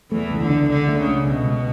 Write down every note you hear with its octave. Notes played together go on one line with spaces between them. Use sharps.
E2 E3 A3
C#2
D3
D4
C#2 D3
A3
C#3
C#2
C#2 B2
C#2